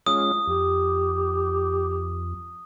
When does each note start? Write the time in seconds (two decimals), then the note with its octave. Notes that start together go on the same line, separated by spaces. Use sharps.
0.06 G#3 C#4 F4 D#6
0.47 F2 G4